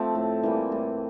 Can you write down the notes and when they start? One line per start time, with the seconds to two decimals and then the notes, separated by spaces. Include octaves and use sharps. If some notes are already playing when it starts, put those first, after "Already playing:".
Already playing: F3 A3 C4
0.15 A2
0.43 E3 G3 A#3
0.72 A2